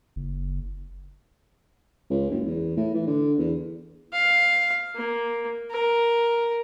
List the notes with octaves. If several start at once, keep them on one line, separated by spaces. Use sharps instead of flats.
F#1
C#2
F#1
E2
A2
E3
D3
E2
F5
A#3
A#4